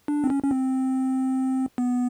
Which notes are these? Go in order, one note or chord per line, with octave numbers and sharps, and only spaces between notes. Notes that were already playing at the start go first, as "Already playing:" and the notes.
D4
C4
C#4
C#4
C4
B3